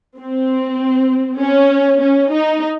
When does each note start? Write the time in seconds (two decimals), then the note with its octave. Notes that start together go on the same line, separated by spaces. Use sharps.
0.19 C4
1.41 C#4
2.01 C#4
2.32 D#4